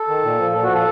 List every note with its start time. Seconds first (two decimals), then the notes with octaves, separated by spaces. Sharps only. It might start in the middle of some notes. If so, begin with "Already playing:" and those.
Already playing: A4
0.08 D#3
0.23 A#2
0.38 F3
0.53 A#2 A4
0.63 F#4
0.69 F3 A4